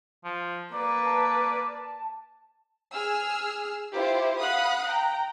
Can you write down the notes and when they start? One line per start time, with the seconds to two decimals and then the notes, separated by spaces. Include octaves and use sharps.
0.25 F3
0.73 A#3 B4 D5
1.06 A5
2.94 G#4 E6 F6
3.93 E4 F4 G4 C5
4.40 F5 F#5 B5 D#6 F#6
4.86 G5 A#5